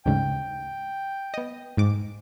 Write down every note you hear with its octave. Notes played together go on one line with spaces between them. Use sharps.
D2 G#2 C#3 G5
B3 D#5
G#2 D6